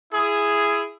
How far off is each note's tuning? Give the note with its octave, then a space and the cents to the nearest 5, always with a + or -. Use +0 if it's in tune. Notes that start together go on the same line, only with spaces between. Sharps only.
E4 +20 G#4 +0